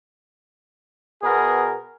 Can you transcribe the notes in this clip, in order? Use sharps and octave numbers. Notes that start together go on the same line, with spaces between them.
B2 B3 G#4 A#4